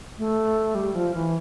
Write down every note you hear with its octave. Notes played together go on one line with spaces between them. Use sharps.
A3
G3
F3
E3